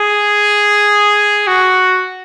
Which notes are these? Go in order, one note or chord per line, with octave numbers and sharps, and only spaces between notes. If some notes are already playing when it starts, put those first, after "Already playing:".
Already playing: G#4
F#4